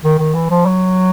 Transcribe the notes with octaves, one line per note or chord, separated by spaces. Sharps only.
D#3
D#3
E3
F3
F#3